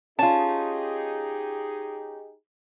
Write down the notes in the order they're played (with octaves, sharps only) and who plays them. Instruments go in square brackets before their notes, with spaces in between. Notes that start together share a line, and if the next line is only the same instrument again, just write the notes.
[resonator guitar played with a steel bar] C#4 F4 [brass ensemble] D#4 G4 G#4 [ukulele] A5